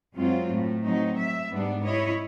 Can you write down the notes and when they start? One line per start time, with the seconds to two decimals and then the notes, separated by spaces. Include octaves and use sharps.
0.14 F#2 F#3 G#3 C4 F4
0.49 A2 A3
0.85 F#3 C4 D#4
1.15 E5
1.48 G#2 G3 B3 D4
1.83 E4 C#5 D#5